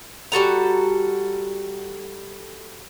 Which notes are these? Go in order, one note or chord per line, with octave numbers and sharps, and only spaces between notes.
G3 F#4 A4 A#5